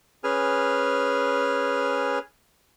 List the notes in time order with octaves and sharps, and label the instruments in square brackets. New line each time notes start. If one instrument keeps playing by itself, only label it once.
[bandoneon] C#4 G#4 B4 G#5 F6